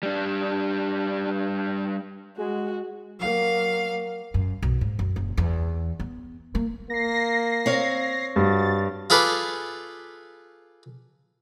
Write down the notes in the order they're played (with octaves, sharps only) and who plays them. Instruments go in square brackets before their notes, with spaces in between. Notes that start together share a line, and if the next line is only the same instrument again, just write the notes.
[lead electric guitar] G3 D4
[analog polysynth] G#3 [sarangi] F#4
[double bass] F#3 A#3 [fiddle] F5
[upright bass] F#2
B1
G#2
F#2
F#1
E2
B3
A#3
[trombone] A#3 [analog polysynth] A#6 C7
[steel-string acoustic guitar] C4 C#5 F5
[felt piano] G2 [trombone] F#4 [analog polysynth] A6
[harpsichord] F4 G#4 A4 B4 D5